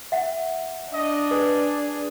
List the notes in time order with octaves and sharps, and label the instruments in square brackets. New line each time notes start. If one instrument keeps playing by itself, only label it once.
[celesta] E5 F#5
[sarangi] D4 [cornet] D#5
[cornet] G#4 [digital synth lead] B4